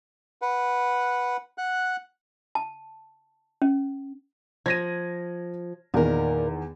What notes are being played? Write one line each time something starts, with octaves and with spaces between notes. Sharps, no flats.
B4 F#5
F#5 F#6
A5
C#4
F3 G#6 A#6 D#7
E2 A#2 D#3 A#4